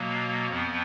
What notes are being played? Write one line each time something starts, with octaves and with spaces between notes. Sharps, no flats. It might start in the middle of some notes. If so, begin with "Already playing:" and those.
Already playing: B2 F#3 A#3
F2 F3 B3